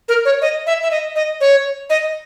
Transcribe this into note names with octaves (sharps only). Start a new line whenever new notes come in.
A#4
C#5
D#5
E5
E5
D#5
D#5
C#5
D#5